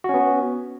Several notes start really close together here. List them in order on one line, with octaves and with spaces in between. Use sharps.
F#4 C#4 B3